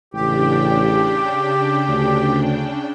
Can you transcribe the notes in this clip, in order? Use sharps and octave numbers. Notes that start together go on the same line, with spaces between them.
A1 C#3 D4 G4 G5
D2